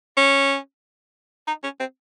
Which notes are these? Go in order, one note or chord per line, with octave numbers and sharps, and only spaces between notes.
C#4
D#4
C#4
C4